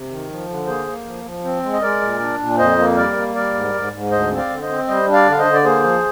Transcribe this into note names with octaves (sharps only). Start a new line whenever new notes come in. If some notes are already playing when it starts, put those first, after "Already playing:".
Already playing: C3
D#3
F3
D3
A#3 G#4 C5
A#3
F3
F3
C4
G#3
D#5
G#3 A#4 D5
A#2
D4
A#2
F2 C5 D#5
A#3
G3 A#4 D5
A#3
G3 A#4 D5
G#2
G#2
G#2
D2 C5 D#5
C4
D5 F5
D3
C5 D#5
C4
G3 C5 D#5
D4
D5 F5
D3
F5
C5 D#5
D3
D5
A#3 G#4 C5
F3